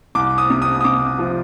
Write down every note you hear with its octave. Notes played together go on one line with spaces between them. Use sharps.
C2 D6
D#6
C3
D#6
D#6
C3 D6
F3